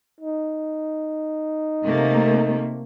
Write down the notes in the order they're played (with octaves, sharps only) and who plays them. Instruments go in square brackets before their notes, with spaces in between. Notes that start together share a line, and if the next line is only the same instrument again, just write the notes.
[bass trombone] D#4
[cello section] C3 A3 A#3